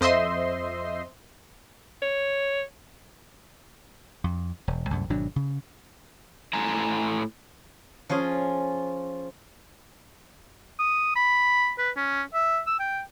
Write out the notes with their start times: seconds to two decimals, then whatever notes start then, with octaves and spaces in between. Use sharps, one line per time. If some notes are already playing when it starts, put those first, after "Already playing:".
0.01 F2 C5 D#5 E5 C6
2.02 C#5
4.24 F2
4.68 E1
4.90 C2 F#2 A2
5.10 G#1 B2 F#3 D4
5.36 C#3
6.53 A2 G#5 A#5
8.10 F3 C#4 F4 G#4
10.79 D#6
11.16 B5
11.79 B4
11.97 C#4
12.34 E5
12.67 E6
12.80 G5